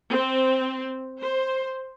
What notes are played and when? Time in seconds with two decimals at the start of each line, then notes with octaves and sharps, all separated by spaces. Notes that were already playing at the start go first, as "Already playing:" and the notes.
0.10 C4
1.19 C5